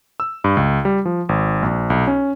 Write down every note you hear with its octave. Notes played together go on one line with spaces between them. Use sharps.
E6
G2
C#2
G3
F3
G#1
A#1
B1
C#4